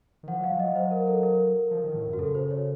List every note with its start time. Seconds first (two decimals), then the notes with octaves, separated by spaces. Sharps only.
0.23 D#3
0.28 F3 F#5
0.40 F#3
0.44 F5
0.52 F3
0.59 F#3 D#5
0.76 C5
0.91 A#4
1.07 A4
1.23 A#4
1.71 F3
1.84 D#3
1.95 A2
2.07 F#2
2.13 F#4
2.19 C#3 A4
2.35 C5
2.51 C#5